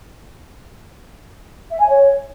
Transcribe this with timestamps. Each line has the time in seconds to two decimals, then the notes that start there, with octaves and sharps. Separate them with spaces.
1.71 E5
1.79 G#5
1.88 C#5